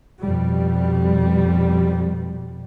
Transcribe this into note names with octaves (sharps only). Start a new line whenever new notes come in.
F2 B2 G3